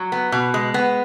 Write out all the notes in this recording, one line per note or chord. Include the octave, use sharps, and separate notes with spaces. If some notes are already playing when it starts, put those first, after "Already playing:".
Already playing: F#3
B3
B2
G#3
B3